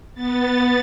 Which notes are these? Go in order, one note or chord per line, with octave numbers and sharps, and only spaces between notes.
B3 A6